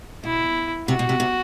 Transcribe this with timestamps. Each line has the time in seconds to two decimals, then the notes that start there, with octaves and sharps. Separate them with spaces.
0.24 B2 E4
0.88 C3 F#4
0.99 B2
1.09 C3
1.20 C3